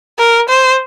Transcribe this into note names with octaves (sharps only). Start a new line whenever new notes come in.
A#4
C5